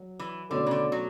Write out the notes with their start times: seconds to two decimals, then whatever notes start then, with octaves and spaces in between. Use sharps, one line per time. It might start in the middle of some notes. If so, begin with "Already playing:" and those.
Already playing: F#3
0.19 E3
0.50 B2 D3 A3 C#4 F#4 A4
0.66 C#3
0.71 D3
0.92 F#3